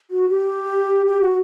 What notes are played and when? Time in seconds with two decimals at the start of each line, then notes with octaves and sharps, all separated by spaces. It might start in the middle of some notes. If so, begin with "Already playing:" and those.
0.11 F#4
0.29 G4
1.06 G4
1.21 F#4